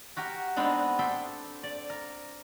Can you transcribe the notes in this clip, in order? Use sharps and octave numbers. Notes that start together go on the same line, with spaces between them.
F#4 G4 A#4
G#3 B3 C4 D4 D#4
A4 C5 E5 G5
D5
A#4